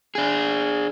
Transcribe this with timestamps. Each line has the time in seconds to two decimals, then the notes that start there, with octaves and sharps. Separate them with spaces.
0.15 D4 G#4